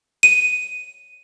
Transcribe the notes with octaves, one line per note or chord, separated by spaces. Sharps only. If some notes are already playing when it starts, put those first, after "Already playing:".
D#7